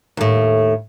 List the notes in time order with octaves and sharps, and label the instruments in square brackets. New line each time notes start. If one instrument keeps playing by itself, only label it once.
[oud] D#2 A2